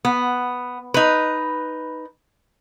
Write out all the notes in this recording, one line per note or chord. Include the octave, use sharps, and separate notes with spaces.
B3
D#4 B4